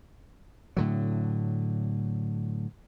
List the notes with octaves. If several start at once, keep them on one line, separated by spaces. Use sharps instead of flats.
A2 D3 F#3